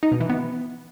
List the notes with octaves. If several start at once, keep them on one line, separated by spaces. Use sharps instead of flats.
D#4
B2
E3
B3